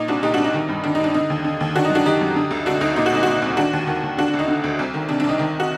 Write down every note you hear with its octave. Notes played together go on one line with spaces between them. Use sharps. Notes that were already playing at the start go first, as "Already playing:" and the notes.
Already playing: A#2 D#4
C2 D4 F#4
A#2 D#4 G4
C2 D4 F#4
D#4
D#3
G2
D#3 D4
D#4
G2 D4
D3 D#4
D#2
D3
D#2
D#3 D4 F#4
D#4
F#2
D4 F#4
D#3 D#4 G4
F#2
D3
D2
D3 D4 F#4
D2 D#4
A#2 D#4
F#4
C2 D#4
F#4
A#2 D#4
C2
D#3 D4 F#4
D#2
D#3
D#2
D3 D4 F#4
D4
D2
D#4
D3
D2
C2
D#3
C3 D4
D4
C2 D#4
D#3
F#4